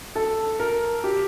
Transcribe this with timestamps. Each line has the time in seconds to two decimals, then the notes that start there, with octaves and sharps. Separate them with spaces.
0.16 A4
0.59 A#4
1.04 G4